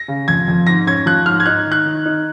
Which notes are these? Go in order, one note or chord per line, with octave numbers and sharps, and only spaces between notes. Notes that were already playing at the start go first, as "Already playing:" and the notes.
Already playing: A#6
C#3
F2 G#6
F2
G#2 A#6
C#4 G#6
F3 F#6
G#2 F6
G#6
D#4 F#6
D#3
F#6
D#3
D#4